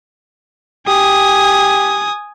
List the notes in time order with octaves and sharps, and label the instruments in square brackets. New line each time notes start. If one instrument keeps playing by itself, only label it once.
[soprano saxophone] G4 [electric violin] G#5 D#6